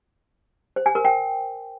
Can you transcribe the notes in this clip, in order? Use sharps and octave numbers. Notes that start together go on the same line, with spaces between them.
C5
G#5
A#4
G5